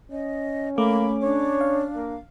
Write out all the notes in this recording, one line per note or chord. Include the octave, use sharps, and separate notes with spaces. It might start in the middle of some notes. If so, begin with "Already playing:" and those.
C#4 D#5
A3 A#3 B5 D6
D4 C#5
F5
A#3